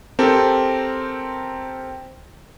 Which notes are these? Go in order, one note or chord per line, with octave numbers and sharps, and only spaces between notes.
C4 G4 A4 A#4